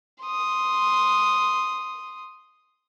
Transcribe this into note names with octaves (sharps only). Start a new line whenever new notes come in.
C6 D#6